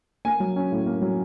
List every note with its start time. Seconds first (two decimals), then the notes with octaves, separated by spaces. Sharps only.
0.25 A#3 G#5
0.40 F#3
0.56 C#4
0.72 A2
0.86 A#3
1.02 F#3